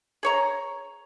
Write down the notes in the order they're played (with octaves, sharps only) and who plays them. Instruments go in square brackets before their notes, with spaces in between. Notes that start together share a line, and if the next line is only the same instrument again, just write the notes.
[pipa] G#4 C#5 A#5